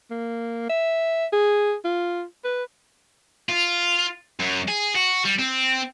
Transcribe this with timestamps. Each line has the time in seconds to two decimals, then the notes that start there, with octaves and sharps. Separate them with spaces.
0.10 A#3
0.69 E5
1.33 G#4
1.84 F4
2.44 B4
3.49 F4
4.39 F#2
4.68 G#4
4.95 F#4
5.25 G3
5.39 C4